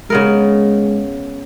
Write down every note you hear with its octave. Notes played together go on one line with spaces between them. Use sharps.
C#3 G#3 B3 A#4